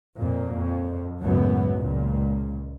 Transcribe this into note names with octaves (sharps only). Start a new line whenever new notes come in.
F2 A#2
F2
C#2 F#2 A2 F#3 B3
C#2 A#2